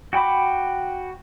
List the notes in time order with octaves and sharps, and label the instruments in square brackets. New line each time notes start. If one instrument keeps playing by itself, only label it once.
[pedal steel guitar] F#4 G5 B5 D6